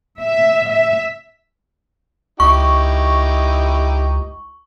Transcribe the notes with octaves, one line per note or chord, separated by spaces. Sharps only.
E5
E5
C#2 D#4 E4 G4 C#6